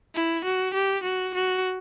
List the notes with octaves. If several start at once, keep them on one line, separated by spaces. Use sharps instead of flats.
E4
F#4
G4
F#4
F#4